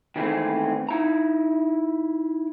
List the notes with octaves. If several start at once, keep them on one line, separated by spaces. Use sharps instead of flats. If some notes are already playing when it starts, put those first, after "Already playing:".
D#3 E3 G#3 A3 B3 C4
D#4 E4 A#5